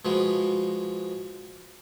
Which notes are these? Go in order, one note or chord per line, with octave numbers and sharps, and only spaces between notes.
B2 F3 G#3 B3